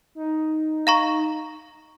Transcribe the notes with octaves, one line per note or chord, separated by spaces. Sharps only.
D#4
F5 A#5 C#6